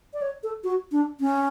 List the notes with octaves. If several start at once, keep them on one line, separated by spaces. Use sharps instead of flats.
D5
C#5
A4
F#4
D4
C#4